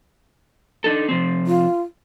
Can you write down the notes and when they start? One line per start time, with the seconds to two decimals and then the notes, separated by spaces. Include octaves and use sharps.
0.84 D4 D#4 A4
1.09 C3 F3 C4
1.47 F4